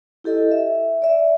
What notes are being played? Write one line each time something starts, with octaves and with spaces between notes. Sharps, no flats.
E4 G4 A4 D#5
E5
D5 E5